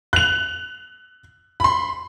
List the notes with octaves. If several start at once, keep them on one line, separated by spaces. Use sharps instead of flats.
F#6 F7
B5 C6